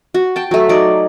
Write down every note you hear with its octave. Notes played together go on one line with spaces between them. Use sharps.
F#4
G5 A5
F#3 A3
F#3 D#4 D5